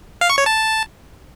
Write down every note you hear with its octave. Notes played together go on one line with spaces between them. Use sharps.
F5
C#6
C#5
A5